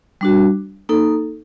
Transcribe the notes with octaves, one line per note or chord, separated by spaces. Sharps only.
G3 D4 F#4
A#3 D#4 A4